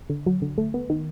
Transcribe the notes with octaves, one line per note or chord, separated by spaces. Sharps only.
D3
F#3
D3
A3
B3
D#3